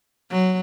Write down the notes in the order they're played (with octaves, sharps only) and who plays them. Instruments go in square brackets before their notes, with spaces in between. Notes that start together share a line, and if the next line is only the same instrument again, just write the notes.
[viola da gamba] F#3